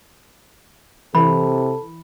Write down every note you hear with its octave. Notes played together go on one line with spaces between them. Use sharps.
C3 E3 A4 B5